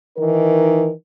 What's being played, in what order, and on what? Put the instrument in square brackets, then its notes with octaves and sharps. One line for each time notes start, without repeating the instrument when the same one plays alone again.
[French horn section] D#3 E3 D#4 A#4